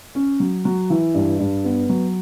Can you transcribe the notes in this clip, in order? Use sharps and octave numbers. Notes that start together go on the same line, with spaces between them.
C#4
F#3
F#3
E3
G2
G2
B3
F#3